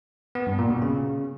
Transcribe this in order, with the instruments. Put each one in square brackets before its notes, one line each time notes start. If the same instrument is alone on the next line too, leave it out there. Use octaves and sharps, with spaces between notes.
[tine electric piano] B3
G2
A#2
B2
C#3